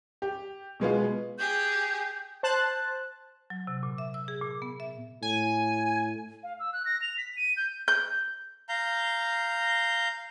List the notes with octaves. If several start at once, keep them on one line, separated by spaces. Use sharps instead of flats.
G4
B2 G#3 B3 F4
G4 G#4 G6
C5 A5 F#6
F#3
C3
A#2
E5
E6
G#4
A#2
B3
E5
A2 G#5
F5
E6
F#6
A#6
F7
B6
D#7
G6
G6
F5 A#5 G6